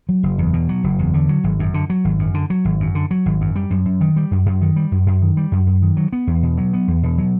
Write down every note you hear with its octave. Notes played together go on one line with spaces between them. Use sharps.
F#3
F#1
E2
B2
F#3
F#1
E2
D3
F#3
G#1
F#2
D3
F#3
G#1
F#2
D3
F#3
G#1
F#2
D3
F#3
G#1
F#2
G3
F#2
F#2
D#3
G3
F#2
F#2
D#3
G3
F#2
F#2
D#3
G3
F#2
F#2
D#3
F#3
B3
E2
B2
F#3
B3
E2
B2
F#3